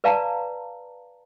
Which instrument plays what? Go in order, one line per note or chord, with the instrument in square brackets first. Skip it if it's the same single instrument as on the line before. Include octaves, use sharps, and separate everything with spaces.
[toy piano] B4 D5 F5 A5 A#5